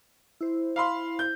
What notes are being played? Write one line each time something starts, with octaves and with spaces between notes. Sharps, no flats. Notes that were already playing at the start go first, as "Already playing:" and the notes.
E4 C5
F5 B5 C6
G6